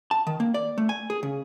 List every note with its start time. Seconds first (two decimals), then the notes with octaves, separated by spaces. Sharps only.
0.11 A5
0.27 D#3
0.40 A#3
0.54 D5
0.78 A3
0.89 G#5
1.10 G#4
1.23 C#3